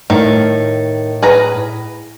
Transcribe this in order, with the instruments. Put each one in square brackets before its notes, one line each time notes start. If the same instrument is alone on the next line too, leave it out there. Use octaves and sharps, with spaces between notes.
[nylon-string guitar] A2 [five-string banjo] D#3
[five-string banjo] G#4 B4 A#5